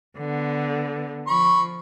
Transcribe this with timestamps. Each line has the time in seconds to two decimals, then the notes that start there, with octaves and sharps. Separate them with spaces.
0.18 D3 B3
1.27 F3 B5 C#6